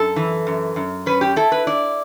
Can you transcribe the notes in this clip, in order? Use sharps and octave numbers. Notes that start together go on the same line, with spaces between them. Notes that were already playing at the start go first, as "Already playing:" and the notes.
Already playing: F#2 A4
E3
F#2
F#2
C#4 B4
G4
E4 A4
B4
E4 D5